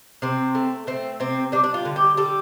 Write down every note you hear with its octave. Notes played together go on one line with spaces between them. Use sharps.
C3 C4
A3
A3 C4
C3 C4
G3 D4
D4
F4
D3
G4
G3 A4